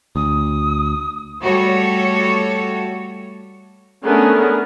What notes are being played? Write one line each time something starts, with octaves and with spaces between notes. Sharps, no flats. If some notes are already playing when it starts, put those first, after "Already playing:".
D2 D#6
G3 A3 F#4 A4 C#5
A3 B3 C#4 D4 G#4 A#4